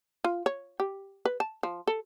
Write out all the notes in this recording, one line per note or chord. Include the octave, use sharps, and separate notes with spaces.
F4
C#5
G4
B4
A5
F3
A4